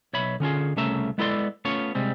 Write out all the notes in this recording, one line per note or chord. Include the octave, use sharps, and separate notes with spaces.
B1 C#5 E5 B5
D3 C#4 F4 G#4
C2 C#3 A3 C#4 E5 A#5
G#3 B3 E4 A4 D5 C6
A3 B3 C#4 F4 C#5
C3 G3 G#3 C4